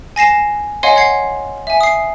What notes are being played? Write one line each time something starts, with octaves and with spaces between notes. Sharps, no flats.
G#5 A#6 C7 E7
C#5 D#5 F5 F#5 G#5 C6
F#5 G#6 C7
E5 G#5
D#6 C7